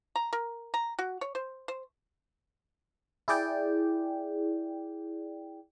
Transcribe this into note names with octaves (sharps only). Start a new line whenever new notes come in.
A#5
A#4
A#5
F#4
C#5
C5
C5
E4 G#4 D5 G5